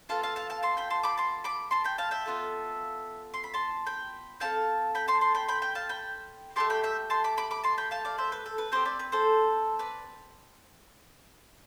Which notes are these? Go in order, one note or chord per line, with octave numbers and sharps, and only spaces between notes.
B3 F4 A4 F5 A5
F5 A5
F5 A5
F5 A5
A5 C6
G5 B5
A5 C6
B5 D6
A5 C6
B5 D6
A5 C6
G5 B5
F5 A5
E5 G5
B3 F4 A4
C6
B5
A5 C6
G5 B5
C4 E4 A4 F5 A5
G5 B5
A5 C6
A5 C6
G5 B5
G5 B5
G5 B5
F5 A5
G5 B5
A3 E4 G4 A5 C6
G5 B5
E5 G5
A5 C6
B5 D6
B5 D6
B5 D6
A5 C6
G5 B5
F5 A5
D5 F5
C5 E5
B4
A4
B4
C4 E4 G4 A4 C5
B4 D5
B4
A4 C5
B4 D5